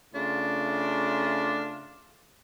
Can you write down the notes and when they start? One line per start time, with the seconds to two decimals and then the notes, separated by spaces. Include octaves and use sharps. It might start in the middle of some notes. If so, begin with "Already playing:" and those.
0.14 C#3 A3 D4 F4